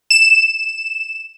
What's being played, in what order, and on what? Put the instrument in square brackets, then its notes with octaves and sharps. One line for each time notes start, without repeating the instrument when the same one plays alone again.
[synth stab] E7